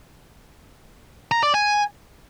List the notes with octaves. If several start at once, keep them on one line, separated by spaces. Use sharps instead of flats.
A#5
D5
G#5